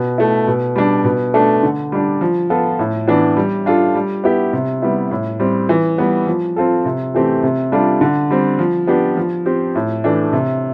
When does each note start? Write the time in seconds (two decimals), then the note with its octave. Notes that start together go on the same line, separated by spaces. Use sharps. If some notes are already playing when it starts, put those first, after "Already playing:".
Already playing: B2
0.18 A3 E4
0.47 B2
0.76 G3 D4
1.04 B2
1.34 A3 D4 A4
1.63 D3
1.92 G3 D4
2.21 F3
2.50 B3 F4 A4
2.79 A2
3.08 E3 B3 D4
3.37 G3
3.66 D4 F4 A4
3.95 G3
4.24 B3 E4 G4
4.53 C3
4.82 G3 B3 E4
5.11 A2
5.40 G3 C4
5.69 E3
5.98 G3 B3
6.27 F3
6.56 C4 F4 A4
6.85 C3
7.14 E3 A3 C4 G4
7.43 C3
7.72 G3 D4 F4 A4
8.01 D3
8.31 G3 C4
8.59 F3
8.87 B3 D4 G4
9.17 F3
9.46 C4 G4
9.75 A2
10.04 E3 A3 D4
10.33 C3